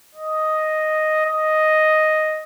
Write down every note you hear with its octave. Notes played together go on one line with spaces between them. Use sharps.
D#5
D#5